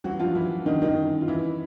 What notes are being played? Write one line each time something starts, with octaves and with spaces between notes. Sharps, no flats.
E3 F#3 F#4
G2 F3 F4
G2 E3 E4
E3
D3 D#3 D#4
F#2 D#3 D#4
F#3
F#2
F4
C#3 E3 E4